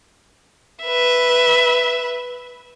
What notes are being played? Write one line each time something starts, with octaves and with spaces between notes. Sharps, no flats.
B4 E5